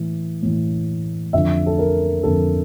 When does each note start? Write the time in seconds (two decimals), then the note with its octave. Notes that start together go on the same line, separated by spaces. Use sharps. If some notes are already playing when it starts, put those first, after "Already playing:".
Already playing: A2 E3
0.42 A2 E3
1.33 F2 D3 F3 E5
1.66 A4
1.79 A#4
2.23 F2 D3 F3 A4